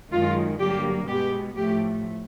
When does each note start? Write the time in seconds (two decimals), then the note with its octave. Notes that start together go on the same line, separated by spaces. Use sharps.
0.11 F#2 D#3 G#3 F4
0.60 G2 D3 F#3 A#3 G4
1.07 B2 G#3 B3 G4
1.56 A2 F3 A3 G4